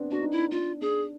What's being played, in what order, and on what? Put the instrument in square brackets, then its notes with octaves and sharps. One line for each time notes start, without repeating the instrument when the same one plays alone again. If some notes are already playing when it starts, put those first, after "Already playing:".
Already playing: [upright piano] B3 C4 D4
[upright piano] D4 [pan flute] F#4
[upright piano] D#4
[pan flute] E4
[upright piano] D4 [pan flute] F4
[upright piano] D4 [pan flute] G#4